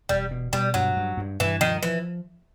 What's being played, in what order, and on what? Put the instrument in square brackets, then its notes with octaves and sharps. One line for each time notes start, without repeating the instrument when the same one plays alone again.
[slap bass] E1 [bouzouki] G3
[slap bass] B2
[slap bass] B2 [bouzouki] G3
[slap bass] G2 [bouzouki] F#3
[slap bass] G2
G2
[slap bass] G2 [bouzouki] E3
[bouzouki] D#3 [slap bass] F3
[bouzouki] E3 [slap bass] F3